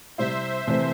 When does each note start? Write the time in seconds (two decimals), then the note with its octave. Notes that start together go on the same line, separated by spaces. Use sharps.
0.18 C3 G3 C4 E4 C5 E5
0.67 C3 E3 A3 C4